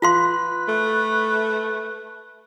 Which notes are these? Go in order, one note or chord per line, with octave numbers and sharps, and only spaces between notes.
F4 B4 F5 C6
A3